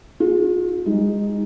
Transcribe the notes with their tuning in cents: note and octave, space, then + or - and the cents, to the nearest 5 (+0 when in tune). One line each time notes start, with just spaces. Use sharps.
F4 +40 G#4 +0
G#3 -25 D#4 +0